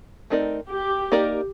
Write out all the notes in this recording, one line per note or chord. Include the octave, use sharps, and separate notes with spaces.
A3 C4 D#4 A#4 D5
G4
A#3 D#4 A#4 D5